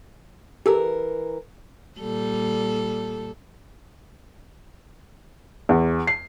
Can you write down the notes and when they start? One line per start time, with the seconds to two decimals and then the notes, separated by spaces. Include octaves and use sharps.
0.66 E3 G4 A4 A#4
2.00 A#2 G3 A4
5.69 E2
6.07 C7